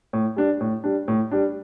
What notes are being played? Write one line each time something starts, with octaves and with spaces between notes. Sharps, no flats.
A2
G3 D4
A2
G3 D4
A2
G3 D4